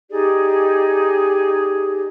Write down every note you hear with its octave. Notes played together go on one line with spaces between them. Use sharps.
D#4 G4 G#4 D5